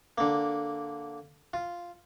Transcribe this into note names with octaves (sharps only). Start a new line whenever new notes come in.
D3 A#3
F4